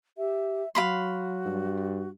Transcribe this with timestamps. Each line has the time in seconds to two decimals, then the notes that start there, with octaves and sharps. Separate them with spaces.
0.18 G4 E5
0.75 F#3 F#4 F5 B5 C6
1.46 G2